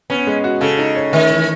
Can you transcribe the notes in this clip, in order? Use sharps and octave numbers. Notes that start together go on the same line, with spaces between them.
B3 C#4
G#3
F#4
C#3 A4
D#4
C#5
D#3 A3
E3